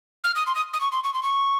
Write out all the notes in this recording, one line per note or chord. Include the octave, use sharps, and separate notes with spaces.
F6
D#6
C6
D#6
D#6
C#6
C6
C#6
C6
C#6